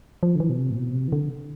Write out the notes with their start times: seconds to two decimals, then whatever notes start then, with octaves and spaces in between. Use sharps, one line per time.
0.23 F3
0.36 D3
0.40 E3
0.50 B2
0.58 C3
0.71 A2
0.76 B2
0.94 C3
1.08 E3
1.12 D3